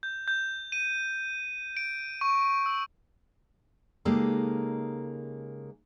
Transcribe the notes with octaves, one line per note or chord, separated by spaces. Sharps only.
G6
G6
D#7
D7
C#6
E6
C#3 G#3 A#3 D#4 G4 A4